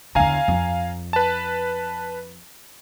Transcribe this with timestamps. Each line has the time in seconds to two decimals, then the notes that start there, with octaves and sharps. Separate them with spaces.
0.15 E2 D3 F5 G#5 A#5
0.48 F2
1.13 B4 A5